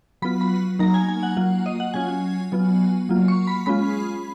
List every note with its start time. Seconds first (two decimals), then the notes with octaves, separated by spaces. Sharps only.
0.22 F#3 B3 F4 B5
0.41 B5
0.79 F#3 A#3 D#4 A#5
0.94 G#5
1.09 G#5
1.23 F#5
1.36 F#3 A#3 F4 F#5
1.66 D#5
1.80 F#5
1.94 F#3 C#4 F4 G#5
2.52 F#3 B3 F4
3.09 F#3 A#3 F4
3.28 C#6
3.47 B5
3.66 G#3 C#4 F4 B5